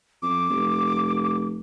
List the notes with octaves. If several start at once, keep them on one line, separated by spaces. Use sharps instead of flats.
F2 D6
F1